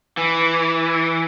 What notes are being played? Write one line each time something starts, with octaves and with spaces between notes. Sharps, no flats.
E3